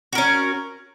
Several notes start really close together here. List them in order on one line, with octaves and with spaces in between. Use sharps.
F#4 A#4 C#4